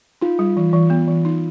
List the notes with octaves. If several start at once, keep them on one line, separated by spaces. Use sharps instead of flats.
D#4 F4
G3
E3
E3
B3
E3
D#4